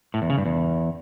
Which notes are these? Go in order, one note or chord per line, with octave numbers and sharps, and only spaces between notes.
A2
E2
C#3
G2
E2